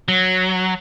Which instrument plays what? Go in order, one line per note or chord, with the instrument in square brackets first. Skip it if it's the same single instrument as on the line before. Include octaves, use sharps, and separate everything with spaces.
[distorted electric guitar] F#3